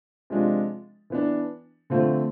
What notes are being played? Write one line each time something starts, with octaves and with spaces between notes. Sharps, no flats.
C3 F3 G#3 D4 F4
E3 B3 D4
D3 F3 A3 C4 F4